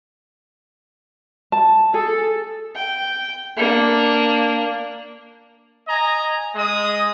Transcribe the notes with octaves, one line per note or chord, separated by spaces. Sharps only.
A5
G#4 A4
G5
A#3 D4
D#5 G#5 A#5
G#3 D#5 D#6